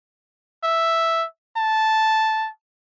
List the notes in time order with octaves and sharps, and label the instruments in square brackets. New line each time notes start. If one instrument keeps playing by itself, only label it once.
[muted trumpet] E5
A5